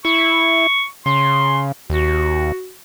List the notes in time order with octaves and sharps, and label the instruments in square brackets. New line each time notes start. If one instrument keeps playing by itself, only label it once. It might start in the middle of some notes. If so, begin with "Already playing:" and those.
[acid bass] E4 [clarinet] C#6
[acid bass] C#3 [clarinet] C6
[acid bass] D#2 [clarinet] F#4